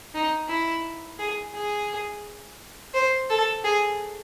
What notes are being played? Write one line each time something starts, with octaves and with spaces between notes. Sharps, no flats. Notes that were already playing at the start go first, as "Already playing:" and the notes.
D#4
E4
G#4
G#4
C5
A4
G#4